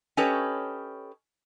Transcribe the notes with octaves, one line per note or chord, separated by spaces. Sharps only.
C#4 G4 A4 B4 C#5 D#5